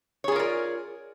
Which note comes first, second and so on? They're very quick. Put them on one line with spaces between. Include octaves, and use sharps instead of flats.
C#5 G#4 F4 A#4 D5